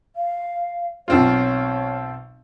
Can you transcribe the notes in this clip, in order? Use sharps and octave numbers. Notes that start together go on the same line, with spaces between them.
F5
B1 C4 F4 C#5